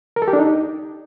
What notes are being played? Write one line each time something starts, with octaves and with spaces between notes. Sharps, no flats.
A#4
A4
G4
D4
D#4